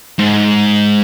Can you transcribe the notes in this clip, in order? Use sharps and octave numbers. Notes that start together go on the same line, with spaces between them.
G#2